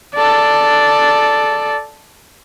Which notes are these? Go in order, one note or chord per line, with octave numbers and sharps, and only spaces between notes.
A4 D5